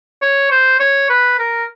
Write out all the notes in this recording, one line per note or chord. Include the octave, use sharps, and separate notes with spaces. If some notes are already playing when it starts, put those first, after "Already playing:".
C#5
C5
C#5
B4
A#4